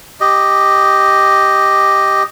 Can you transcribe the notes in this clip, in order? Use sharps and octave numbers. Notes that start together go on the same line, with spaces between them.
G4 D#5